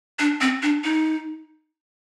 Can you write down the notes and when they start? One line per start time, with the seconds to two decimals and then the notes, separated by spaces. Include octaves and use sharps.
0.19 D4
0.41 C4
0.63 D4
0.84 D#4